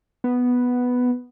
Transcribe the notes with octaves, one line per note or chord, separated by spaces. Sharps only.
B3